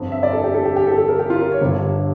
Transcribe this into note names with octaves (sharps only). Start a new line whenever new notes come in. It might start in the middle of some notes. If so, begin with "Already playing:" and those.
Already playing: G1 F2 D3
E5
D5
A4
G4
A4
G4
G4
A4
A4
A#4
G4
F4
A#4
C#5
G1 G2 D3